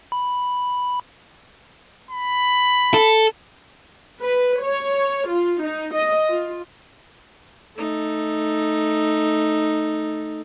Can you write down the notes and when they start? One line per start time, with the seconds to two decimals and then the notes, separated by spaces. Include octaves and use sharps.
0.12 B5
2.11 B5
2.94 A4
4.22 B4
4.63 C#5
5.29 F4
5.62 D#4
5.94 D#5
6.28 F4
7.77 A3 D#4